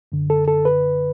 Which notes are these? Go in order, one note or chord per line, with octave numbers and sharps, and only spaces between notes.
F#2 D3
A4
A4
B4